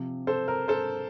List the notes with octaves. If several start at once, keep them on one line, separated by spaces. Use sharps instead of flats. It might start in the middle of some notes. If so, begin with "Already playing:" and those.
Already playing: C3 F3
A4 C5
A#4
A4 C5